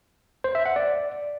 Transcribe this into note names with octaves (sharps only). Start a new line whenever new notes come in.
C5
E5
F#5
D5